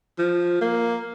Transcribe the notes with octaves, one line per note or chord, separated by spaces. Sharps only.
F3
A#3